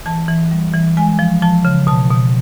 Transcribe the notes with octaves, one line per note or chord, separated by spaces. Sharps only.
E3 A5
E3
G3
E3
G#3 G#5
F3
F3 A5
C#3
B2 A5
B2